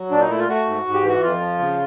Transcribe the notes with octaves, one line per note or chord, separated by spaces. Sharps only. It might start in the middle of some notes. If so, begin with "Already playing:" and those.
Already playing: F#3
A#2 D4
D#4
A3 E4
F4
A3 F#4
G#2
G#2
G4
E3 F#4
F2 F4
F3
C#3